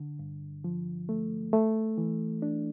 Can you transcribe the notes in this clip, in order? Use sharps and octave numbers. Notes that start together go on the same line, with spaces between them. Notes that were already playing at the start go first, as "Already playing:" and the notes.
Already playing: D3
G2
F3
A3
A3
E3
D4